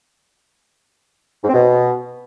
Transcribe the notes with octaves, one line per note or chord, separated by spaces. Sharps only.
G#2
C4
B2